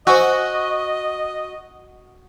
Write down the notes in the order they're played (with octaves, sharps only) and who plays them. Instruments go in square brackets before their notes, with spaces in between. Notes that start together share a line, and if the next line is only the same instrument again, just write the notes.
[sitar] F#4 [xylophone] C5 G#5 E6 [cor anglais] D#5